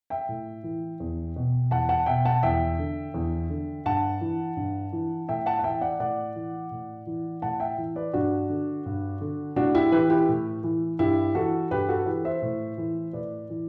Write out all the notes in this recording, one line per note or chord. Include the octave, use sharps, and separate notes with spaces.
E5 G5
A2
E3
E2
B2
E2 F#5 A5
F#5 A5
B2 E5 G5
F#5 A5
E2 E5 G5
D3
E2
D3
G2 F#5 A5
E3
G2
E3
A2 E5 G5
F#5 A5
F#5
E3 E5 G5
D5 F#5
A2 D5 F#5
E3
A2
E3
A2 F#5 A5
E5 G5
E3
B4 D5
G2 D4 F#4
D3
G2
D3
A2 D4 F#4
E4 G4
E3 G4 B4
E4 G4
A2
E3
G2 E4 G4
E3 F#4 A4
G2 G4 B4
F#4 A4
E3 G4 B4
C5 E5
A2
E3
A2 B4 D5
E3